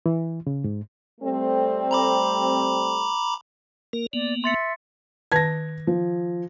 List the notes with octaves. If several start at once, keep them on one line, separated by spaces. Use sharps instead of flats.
E3
C#3
G#2
G3 A3 C4
A#5 B5 D6
A#3 A#4
A#3 B3 D5
E5 C6 A6 C#7
D#3 B4 A5 G#6 A#6
F3